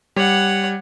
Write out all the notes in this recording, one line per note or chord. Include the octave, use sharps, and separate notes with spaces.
G3 C#5 F#5